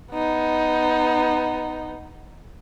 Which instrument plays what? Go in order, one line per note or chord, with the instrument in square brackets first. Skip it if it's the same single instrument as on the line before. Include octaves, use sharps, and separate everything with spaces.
[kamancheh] B3 D#4